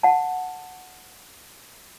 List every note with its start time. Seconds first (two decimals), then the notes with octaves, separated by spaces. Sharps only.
0.03 F#5 A5